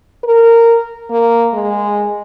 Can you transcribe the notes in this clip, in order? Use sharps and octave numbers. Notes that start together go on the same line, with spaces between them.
A#4
A#3
G#3